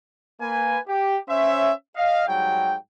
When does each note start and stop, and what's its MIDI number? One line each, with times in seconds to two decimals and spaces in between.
0.41 0.78 58
0.41 0.78 71
0.41 0.78 80
0.88 1.17 67
1.29 1.73 61
1.29 1.73 72
1.29 1.73 73
1.29 1.73 76
1.96 2.25 75
1.96 2.25 77
2.28 2.76 44
2.28 2.76 54
2.28 2.76 55
2.28 2.76 79